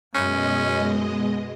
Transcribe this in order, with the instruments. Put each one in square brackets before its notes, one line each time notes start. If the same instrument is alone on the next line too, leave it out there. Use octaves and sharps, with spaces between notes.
[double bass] F#2 [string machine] B2 G#3 D#5 [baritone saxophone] C#4